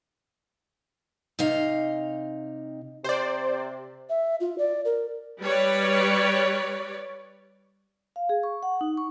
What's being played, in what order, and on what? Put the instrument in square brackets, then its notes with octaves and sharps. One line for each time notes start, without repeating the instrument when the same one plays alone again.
[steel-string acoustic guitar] C3 D#4 F5
[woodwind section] C3 [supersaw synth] C5 D5
[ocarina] E5
F4
D5
A#4
[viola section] G3 B4 C#5 D5
[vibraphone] F5
G#4
C#6
F#5
D#4
C#6